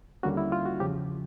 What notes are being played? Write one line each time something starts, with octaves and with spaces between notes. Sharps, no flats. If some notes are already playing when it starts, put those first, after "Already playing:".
D#2 D3 G3 A#3 C#4 F#4
E4
F4
F#4
E2 C#3 F3 G4